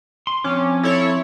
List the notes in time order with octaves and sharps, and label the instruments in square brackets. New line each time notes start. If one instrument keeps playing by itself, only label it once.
[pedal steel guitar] C6
[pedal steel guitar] F3 C4 D6 [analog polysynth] C#4
[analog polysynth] E4 A4 C#5